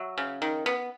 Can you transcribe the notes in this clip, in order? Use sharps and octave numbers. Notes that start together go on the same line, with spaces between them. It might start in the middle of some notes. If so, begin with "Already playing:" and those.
Already playing: F#3 E5
C#3
D#3
B3